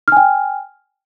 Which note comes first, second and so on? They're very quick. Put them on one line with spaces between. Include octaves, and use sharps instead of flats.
F6 G#5 G5